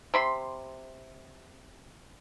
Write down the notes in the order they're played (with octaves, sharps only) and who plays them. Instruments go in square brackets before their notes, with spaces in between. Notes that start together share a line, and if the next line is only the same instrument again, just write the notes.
[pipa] C3 B5 C6